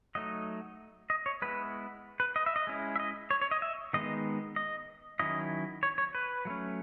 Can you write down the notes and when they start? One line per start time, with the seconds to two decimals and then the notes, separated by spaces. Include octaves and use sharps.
0.15 F#3 A3 D#4 D#5
1.10 D#5
1.26 C#5
1.42 G#3 B3 E4 B4
2.20 B4
2.36 D#5
2.46 E5
2.56 D#5
2.67 G#3 C#4 E4
2.96 E5
3.00 D#5
3.31 C#5
3.42 C#5
3.51 D#5
3.62 E5
3.93 D#3 G#3 B3 D#4 D#5
4.56 D#5
5.19 D#3 F#3 C#4 E4 D#5
5.83 C#5
5.98 C#5
6.15 B4
6.45 F#3 A3 C#4